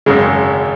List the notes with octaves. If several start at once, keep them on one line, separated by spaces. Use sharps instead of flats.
G#1 F#2 C#3 G#3